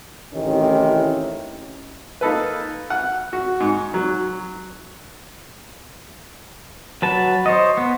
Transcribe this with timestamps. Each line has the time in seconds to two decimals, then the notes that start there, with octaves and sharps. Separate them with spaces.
0.34 A1 A2 C3 D#3 C#4
2.21 A#3 D#4 A4 B4
2.90 F#5
3.33 F#4
3.60 G#2
3.94 F#3
7.02 F#3 B4 A5
7.46 C5 C#5 D#5
7.77 B3